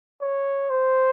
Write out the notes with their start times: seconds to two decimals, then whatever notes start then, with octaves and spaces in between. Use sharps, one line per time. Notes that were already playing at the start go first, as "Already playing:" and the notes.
0.22 C#5
0.70 C5